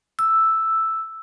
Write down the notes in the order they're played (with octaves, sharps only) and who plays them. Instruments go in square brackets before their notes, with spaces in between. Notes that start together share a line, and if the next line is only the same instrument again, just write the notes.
[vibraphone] E6